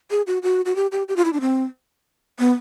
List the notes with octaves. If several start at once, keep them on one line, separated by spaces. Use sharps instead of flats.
G#4
F#4
F#4
F#4
G4
G4
G4
F4
E4
D4
C4
B3